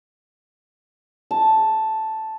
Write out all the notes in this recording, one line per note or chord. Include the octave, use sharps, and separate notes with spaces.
A5